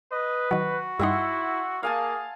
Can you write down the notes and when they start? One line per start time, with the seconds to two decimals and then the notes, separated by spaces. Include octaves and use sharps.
0.12 B4 D#5
0.51 D#3 F#3 F#4
0.99 G2 G3 D#4 E4 E5 F#5 C6
1.83 A#3 G#4 F5 G#5 A5